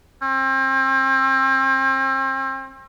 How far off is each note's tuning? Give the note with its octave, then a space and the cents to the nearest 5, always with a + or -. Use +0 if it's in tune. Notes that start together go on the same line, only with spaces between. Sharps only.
C4 +35